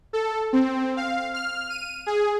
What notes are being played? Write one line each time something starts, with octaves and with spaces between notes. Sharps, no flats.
A4
C4
F5
F6
D#7
G#4